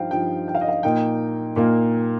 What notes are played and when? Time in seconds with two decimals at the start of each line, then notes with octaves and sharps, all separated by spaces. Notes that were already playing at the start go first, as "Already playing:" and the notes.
Already playing: G2 F3 D#4 C5 F5 G5
0.11 G2 F3 D#4 G5
0.48 G5
0.55 F5
0.61 D#5
0.68 F5
0.83 A#2 A#3 D#4 G5
1.56 A#2 A#3 D#4